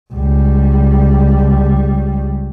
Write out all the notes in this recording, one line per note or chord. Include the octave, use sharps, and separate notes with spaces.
C#2 G3